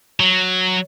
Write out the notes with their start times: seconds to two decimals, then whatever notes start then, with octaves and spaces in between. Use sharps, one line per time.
0.20 F#3